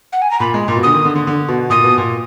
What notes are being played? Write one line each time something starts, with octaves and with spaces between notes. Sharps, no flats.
F#5
G#5
A#5
A#2 B5
G#3
A#2
B2
D3 D#6
D#3
D3
D3
D3
B2
A#2 D#6
B2
A#2